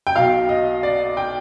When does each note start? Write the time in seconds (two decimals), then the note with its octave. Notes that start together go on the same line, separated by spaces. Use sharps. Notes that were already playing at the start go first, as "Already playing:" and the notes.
0.07 G5
0.16 B1 B2 F5
0.49 D#5
0.83 D5
1.17 G5